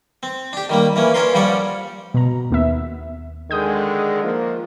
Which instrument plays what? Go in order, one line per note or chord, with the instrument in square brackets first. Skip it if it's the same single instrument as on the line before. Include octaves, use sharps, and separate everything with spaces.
[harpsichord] C4
D4 G4
D#3 G3 A#3
E3 A#3 C#4
C#4 D4 A#4 B4 C6
G2 F3 G3 C#4 D5 F#5
[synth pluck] B2 A#5
D#2 B3 E5
[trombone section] D3 D#3 G#3 [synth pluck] D#6 G6
[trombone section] F3 A#3